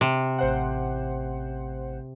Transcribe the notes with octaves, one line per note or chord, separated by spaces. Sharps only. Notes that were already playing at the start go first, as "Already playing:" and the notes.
C3
A1 C5 F#5